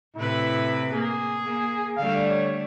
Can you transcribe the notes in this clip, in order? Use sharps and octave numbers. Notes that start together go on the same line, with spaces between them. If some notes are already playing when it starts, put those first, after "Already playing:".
A2 C3 E4 B4
A#3 G#4
A#3
D3 G3 A3 F5
C#5